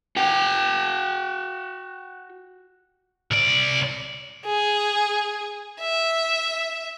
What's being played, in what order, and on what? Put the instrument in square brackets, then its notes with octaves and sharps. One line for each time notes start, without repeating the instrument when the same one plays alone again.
[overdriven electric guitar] F#4 G5
[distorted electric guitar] C2 D5
[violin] G#4
E5